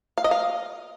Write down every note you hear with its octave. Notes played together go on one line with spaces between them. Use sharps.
F5
D#5
F5